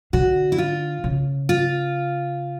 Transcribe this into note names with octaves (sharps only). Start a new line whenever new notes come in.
D3 F#4
E4
F4
C#3
F4